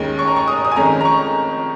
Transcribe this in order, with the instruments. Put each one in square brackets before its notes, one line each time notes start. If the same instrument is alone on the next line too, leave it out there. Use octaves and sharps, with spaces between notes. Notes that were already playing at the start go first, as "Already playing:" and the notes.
Already playing: [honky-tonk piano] D#2 D#3 G#3 C#4
C#6
A#5
C#6
D#6
D#6
G#5
F2 D#3 G#3 C#4 A#5
A#5
C#6